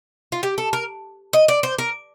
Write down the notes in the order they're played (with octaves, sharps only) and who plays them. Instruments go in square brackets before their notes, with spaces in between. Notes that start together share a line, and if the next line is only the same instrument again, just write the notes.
[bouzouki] F4
G4
A4
A#4
D#5
D5
C5
A#4